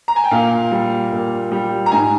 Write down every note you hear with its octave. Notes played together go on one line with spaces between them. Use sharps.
A#5
G#5
G5
A#2 F5
G3
A#2
G3
A#5
G#2 G#5